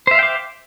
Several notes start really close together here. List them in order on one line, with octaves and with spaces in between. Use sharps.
C5 E5 F5 G5 D6